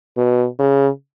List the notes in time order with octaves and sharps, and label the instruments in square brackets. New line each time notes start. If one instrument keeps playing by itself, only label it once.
[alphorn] B2
C#3